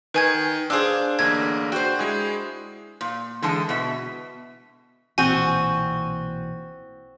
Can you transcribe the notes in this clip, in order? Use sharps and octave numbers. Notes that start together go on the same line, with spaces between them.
D#3 B4 G#5 G#6
D4 F4 G#4 C5 E6
A1 D3 A#3 G#6
F#4 C5 G5 G6
G#3 E4 G#4
A#2
D3 E3 G#3 A5
B2 E5
B1 A#2 E3 C4 F#4 G#5